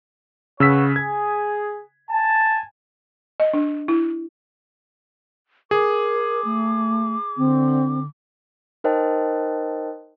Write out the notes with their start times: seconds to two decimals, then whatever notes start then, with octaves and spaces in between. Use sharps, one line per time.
0.60 C#3 B4 C#5 F#5 E6 B6
0.96 G#4 G#6
2.09 G#5 A5
3.40 D#5
3.53 D4
3.88 E4
5.71 G#4 A#4 D6
6.45 A3
7.37 D3 C4
8.84 D#4 A#4 C5 D#5 G5 A5